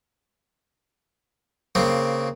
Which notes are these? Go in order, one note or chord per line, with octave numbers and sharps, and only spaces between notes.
C#3 A#3 C4